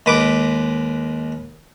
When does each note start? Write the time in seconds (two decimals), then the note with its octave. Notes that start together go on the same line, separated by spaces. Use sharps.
0.06 D#2 G#3 B4 D6